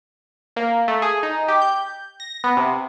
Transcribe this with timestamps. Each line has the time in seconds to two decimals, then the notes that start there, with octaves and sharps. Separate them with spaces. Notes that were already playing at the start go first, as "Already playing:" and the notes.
0.56 A#3
0.88 A3
1.02 G#4
1.23 D#4
1.48 G4
1.62 G6
2.20 A#6
2.44 B3
2.57 C3